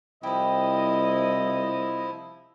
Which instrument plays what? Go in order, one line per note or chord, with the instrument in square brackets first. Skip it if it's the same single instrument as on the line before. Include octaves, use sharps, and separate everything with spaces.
[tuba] C2 [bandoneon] F3 E4 [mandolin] G4 B4 [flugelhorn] D#5